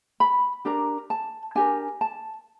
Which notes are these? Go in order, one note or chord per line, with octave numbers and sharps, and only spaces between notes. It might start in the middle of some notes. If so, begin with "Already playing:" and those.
B5
D4 G4 A#4 A#5
A5
D4 G4 A#4 G#5
A5